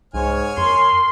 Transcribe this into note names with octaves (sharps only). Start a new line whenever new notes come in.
C2 G#2 C#5 G#5 F6
F2 A#4 C6